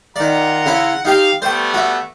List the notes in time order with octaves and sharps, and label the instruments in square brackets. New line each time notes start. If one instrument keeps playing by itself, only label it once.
[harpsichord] D#3 D5 [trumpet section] F4 F#5 A#5
[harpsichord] C#3 C#4 E4
[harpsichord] D#4 G4 G5 [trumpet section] F5
[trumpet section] G3 A3 B3 [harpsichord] C5 G5
[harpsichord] F#4 E5